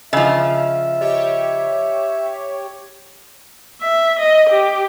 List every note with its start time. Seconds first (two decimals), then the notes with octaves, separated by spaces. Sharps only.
0.13 C#3 F3 D#5 E5 E6
1.01 G4 C#5 D#5
3.81 E5
4.19 D#5
4.49 G4